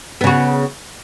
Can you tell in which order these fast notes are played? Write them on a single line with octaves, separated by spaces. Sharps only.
B3 C#3 F#4